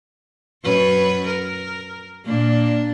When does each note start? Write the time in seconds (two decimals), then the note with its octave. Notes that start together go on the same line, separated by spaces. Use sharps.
0.63 F#2 B4 C#5
1.27 A#4
2.25 A#2 A#3 D4